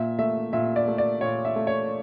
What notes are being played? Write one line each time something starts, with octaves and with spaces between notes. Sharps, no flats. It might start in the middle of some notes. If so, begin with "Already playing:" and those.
Already playing: A#2 E5
A3 E5
A#2 E5
D5
A3
D5
A#2 C#5
E5
A3
C#5